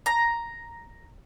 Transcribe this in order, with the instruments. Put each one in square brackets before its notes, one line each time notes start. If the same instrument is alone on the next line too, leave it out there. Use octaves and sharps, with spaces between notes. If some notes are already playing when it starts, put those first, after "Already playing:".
[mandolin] A#5